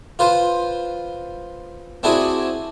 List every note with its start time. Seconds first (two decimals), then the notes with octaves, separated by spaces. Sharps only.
0.19 F4 B4 C5
2.03 C4 D4 E4 F#4 G#4